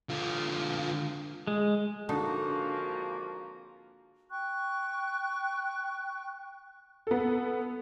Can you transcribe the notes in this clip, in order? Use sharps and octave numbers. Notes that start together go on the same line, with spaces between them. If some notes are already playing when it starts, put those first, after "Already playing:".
D3 F4
G#3
G#1 D3 F3 A#3 D#4 F#4
G5 C#6 F#6
B3 A4